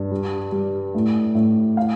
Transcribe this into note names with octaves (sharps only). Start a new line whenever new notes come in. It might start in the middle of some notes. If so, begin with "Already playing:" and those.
Already playing: G2
G3
G3
A2
A2
F5